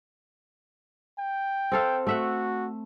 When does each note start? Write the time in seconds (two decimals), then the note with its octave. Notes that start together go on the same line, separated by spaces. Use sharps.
1.19 G5
1.72 C4 A4 F5
2.07 A3 F#4 E5 F#5